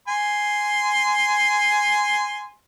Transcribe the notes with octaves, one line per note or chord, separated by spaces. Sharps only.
G#5 C6